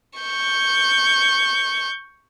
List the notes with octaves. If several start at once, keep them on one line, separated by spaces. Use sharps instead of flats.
C#6 G6